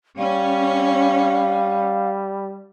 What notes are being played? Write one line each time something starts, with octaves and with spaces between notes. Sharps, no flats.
G3 C#4 F5